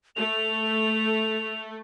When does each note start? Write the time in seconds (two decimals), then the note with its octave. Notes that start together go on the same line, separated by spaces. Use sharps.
0.16 A3 F7